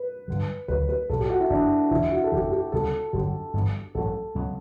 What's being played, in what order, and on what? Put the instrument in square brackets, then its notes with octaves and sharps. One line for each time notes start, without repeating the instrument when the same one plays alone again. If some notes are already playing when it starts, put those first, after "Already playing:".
Already playing: [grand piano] B4
[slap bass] G2 D3 F#3
[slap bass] D2 C#3 F#3 [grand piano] B4
[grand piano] B4
[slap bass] B1 A2 F#3 [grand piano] A4
[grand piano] G4
F#4
E4
[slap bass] F#1 F#2 E3 [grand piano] D4
[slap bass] E1 E2 D3 [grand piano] E4
[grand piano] F#4
A4
[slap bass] F#1 F#2 E3 [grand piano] G4
[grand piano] G4
[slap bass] D2 C#3 G3 B3 [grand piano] A4
[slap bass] G1 F#2 D3 F#3 [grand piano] G4
[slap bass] G1 G2 E3 B3
[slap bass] A1 G2 F#3 [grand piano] A4
[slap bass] C#2 C#3 F#3 B3